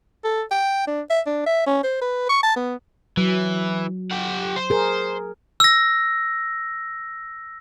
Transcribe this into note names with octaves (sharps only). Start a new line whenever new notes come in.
A4
G5
D4
E5
D4
E5
C#4
C5
B4
C#6
A5
B3
E3 F#3
G4 F#5
C5
G#4 A#4
E6 A#6